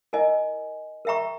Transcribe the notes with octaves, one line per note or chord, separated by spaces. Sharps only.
E4 A#4 D#5 G#5
A#4 E5 G5 A#5 C#6